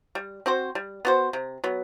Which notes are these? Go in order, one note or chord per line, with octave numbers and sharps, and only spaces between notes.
G3
C4 F#4 C5
G3
B3 F#4 C5
C3
F#3 B3